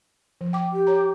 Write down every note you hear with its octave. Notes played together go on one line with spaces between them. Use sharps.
F3
G5 D6
G4
C#5 A#5